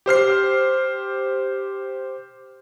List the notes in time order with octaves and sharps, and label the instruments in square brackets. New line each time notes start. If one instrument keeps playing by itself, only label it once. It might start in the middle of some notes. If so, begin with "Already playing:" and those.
[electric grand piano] G4 C5 F6 C7